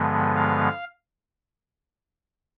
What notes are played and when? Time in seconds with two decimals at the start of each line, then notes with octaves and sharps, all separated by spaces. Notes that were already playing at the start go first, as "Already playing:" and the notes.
Already playing: G2 D3 F3 G#3 B3
0.35 F5